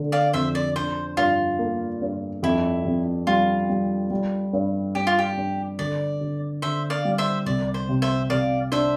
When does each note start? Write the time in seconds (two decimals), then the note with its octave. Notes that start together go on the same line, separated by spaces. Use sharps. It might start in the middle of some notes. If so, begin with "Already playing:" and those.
Already playing: D3 A3
0.12 D5 F5
0.33 F2 C5 E5
0.55 D5
0.76 D4 C5
1.17 G2 F4
1.59 A#3
2.02 G2
2.43 F2 E4
2.85 F2
3.27 G3 F4
3.69 G3
4.11 G3
4.53 G2
4.95 G2 G4
5.07 F4
5.19 G4
5.37 G2
5.79 D3 D5
6.21 D3
6.62 D3 C5 E5
6.90 D5 F5
7.05 G3
7.18 C5 E5
7.46 C2 D5
7.74 C5
7.89 C3
8.02 C5 E5
8.30 C3 D5 F5
8.72 D4 C5 E5